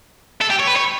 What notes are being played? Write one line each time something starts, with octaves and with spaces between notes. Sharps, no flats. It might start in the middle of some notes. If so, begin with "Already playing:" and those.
A4
G4
C#5
B4
C#5